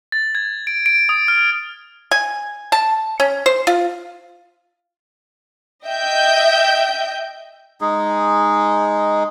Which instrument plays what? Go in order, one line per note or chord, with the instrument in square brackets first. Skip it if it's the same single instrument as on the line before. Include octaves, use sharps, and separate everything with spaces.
[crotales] A6
G#6
D7
D7
D#6
F6
[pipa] G#5
A5
C#4
C5
F4
[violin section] D#5 E5 G5 G6
[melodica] G#3 D#4 G#4